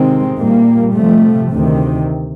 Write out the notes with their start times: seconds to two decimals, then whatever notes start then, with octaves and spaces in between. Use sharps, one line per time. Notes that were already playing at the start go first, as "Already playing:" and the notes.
Already playing: C3 D#3 G#3 C4
0.38 A#2 G3 A#3
0.96 C3 F3 A3
1.52 D2 C3 D#3